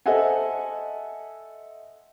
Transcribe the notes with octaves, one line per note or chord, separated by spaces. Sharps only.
A4 C5 D#5 E5 F#5 G#5